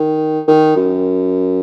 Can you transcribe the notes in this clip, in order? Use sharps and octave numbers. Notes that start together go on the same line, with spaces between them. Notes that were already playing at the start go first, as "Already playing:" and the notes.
Already playing: D#3
D#3
F#2